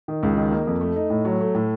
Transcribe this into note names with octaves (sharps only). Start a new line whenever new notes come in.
D#3
C#2
D#3
A#3
F2
A3
D#4
A2
F#3
A3
A2